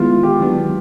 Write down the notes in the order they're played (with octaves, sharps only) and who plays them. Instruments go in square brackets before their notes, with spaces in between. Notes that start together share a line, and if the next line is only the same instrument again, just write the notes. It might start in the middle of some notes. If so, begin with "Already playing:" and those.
Already playing: [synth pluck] D#3 G#3 B3 E4 [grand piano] F4
[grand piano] G4
[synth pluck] D#3 F#3 B3 D4